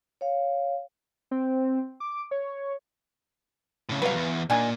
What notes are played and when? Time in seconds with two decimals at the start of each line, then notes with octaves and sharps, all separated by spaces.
0.21 C#5 F5
1.31 C4
2.00 D6
2.31 C#5
3.89 A2 C#3
4.02 C2 F#3 B4 F5
4.15 E2
4.50 A#2 D#3 D4 G#5